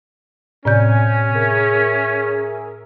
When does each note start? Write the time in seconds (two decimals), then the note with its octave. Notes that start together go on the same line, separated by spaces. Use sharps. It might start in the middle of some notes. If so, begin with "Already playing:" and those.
0.65 A2 C3 C#4 D5 G#5 G6
1.34 G#4 A#4 E5